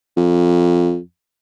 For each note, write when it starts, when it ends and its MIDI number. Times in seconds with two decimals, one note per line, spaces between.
0.17 0.98 41